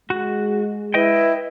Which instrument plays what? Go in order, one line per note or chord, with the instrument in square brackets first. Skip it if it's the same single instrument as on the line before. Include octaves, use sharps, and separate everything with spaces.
[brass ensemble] G#3 [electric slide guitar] F#4
[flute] E4 [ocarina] B4 [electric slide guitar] D#5 G5